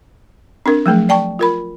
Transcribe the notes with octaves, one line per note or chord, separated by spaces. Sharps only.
C4 D4 A#4
F3 F#3 A3 G#4
D5 G5 A5 C#6
F4 A#4 B5